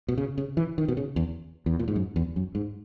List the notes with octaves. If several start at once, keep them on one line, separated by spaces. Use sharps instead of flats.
B2
C#3
C#3
E3
D#3
B2
C#3
E2
E2
A#2
G#2
F#2
E2
F#2
G#2